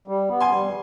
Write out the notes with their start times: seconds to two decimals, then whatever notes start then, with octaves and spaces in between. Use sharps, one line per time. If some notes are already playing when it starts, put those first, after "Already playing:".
0.08 G3
0.30 B3
0.40 G#5 C6
0.52 G3